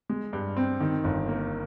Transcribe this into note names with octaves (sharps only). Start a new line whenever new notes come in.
G#3
G2
C4
D#3
G1
A#3